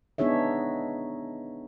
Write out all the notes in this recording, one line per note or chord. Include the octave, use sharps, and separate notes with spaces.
B3 D4 D#4 G#4 C#5 E5